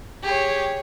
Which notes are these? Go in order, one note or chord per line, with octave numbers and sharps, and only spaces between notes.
G4 G#4 C#5